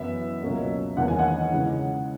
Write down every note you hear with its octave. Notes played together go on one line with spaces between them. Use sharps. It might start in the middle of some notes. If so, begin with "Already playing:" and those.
Already playing: F#2 E3 B3 E4 E5
C#2 B2 F#3 A#3 C#4
E1 E2 D#3 A#3 F#5
G#5
D#5 F#5
E2 C#3 G#3 C#4 E4